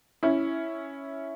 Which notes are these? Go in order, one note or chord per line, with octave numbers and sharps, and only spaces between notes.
C#4 E4